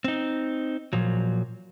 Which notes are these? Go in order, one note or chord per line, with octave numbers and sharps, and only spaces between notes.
C4 D#4
A#2 F3 F#3